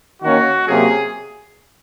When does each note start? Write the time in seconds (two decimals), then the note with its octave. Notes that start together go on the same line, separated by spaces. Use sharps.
0.21 D#3 A#3 C#4 F#4
0.66 C3 F#3 A#3 C#4 G#4